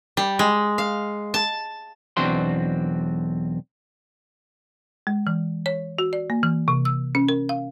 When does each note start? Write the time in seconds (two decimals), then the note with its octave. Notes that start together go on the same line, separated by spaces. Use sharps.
0.17 G3
0.39 G#3
0.78 F5
1.34 A5
2.17 B1 E2 C4 D4 F#4 C6
5.07 G#3
5.27 E3
5.66 C#5
5.99 F#4
6.13 D5
6.30 A#3
6.43 E3
6.68 C3
6.85 E6
7.15 C#4
7.29 A#4
7.49 F5